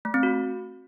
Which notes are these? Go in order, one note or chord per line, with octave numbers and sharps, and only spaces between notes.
A3
C4
F#4